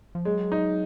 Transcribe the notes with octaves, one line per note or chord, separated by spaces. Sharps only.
F3
F#3 G#3
D#4